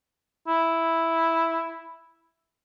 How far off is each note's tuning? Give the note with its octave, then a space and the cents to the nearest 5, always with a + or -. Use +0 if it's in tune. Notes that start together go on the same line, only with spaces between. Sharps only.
E4 +0